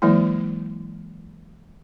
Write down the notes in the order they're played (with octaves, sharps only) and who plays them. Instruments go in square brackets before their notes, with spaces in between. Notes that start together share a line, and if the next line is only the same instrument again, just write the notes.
[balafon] E3 F#3 G#3 A#3 E4